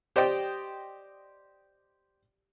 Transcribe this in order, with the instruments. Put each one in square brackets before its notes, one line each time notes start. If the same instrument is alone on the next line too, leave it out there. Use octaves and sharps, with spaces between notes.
[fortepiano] G4 C5 D5 D#5 G5